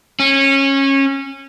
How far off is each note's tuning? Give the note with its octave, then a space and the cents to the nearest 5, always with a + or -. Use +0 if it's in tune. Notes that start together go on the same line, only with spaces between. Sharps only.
C#4 -20